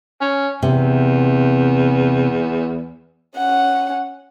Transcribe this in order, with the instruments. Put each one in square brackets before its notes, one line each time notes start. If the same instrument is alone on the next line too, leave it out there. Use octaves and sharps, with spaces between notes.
[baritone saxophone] C#4
[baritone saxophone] E2 [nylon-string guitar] C3
[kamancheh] C#4 F#5